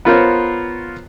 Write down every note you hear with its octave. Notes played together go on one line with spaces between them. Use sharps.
B3 F4 A#4 C5 C#5